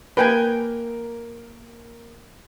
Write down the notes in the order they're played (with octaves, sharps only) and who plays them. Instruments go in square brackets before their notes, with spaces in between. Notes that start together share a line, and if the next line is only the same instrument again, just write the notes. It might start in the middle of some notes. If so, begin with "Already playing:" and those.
[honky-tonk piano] A#3 A#4 [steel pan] B4 G5 G#5